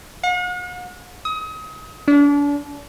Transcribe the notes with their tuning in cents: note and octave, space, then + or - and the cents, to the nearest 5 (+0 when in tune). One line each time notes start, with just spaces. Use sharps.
F#5 -45
D#6 +35
D4 -35